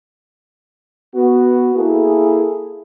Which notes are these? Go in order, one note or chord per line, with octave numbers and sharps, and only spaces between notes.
B3 F#4
A#3 E4 G#4 A4